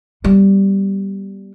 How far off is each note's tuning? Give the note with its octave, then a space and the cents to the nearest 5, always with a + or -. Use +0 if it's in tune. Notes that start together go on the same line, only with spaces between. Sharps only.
G3 -5 B3 -35